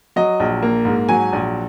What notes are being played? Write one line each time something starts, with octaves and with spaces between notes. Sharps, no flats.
F#3 D#5
A#1
A#3
G#2
F#3 G#5
A#1